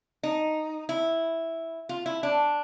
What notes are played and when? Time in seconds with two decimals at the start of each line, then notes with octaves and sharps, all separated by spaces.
0.23 D#4
0.89 E4
1.89 F4
2.06 E4
2.23 D4